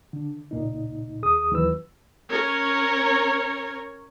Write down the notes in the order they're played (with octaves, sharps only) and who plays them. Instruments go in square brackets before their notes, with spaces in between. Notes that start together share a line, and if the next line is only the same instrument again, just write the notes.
[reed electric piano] D3
C#2 A#2 D#4
D#2 G#4 D#6
D#2 E3 F#3 B4 E6
[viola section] C#4 A#4 C#5